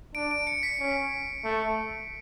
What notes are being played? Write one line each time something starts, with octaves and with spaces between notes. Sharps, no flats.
D4 D7
D7
C#7
B6
C#4
A3